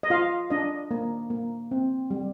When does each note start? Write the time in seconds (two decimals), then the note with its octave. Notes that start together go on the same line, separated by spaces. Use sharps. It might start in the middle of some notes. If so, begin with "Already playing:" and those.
0.03 D#5
0.10 F4 F5
0.50 D4 D#5
0.91 A#3
1.30 A#3
1.71 C4
2.11 G3